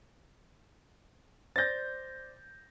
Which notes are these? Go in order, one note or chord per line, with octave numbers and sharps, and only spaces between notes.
C5 D5 G6 A6 A#6